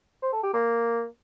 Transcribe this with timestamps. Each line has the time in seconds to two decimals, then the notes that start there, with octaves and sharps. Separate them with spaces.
0.22 C5
0.33 A4
0.43 G4
0.54 A#3